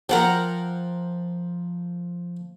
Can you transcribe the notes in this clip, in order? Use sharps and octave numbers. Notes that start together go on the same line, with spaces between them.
F3 A#4 F#5 G5